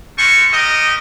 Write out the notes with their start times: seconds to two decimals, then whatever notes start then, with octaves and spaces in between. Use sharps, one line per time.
0.17 G3 G#3 C#6
0.52 G4 A#4 D#5